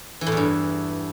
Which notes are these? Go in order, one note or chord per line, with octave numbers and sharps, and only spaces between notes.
E3
A2
E2
G2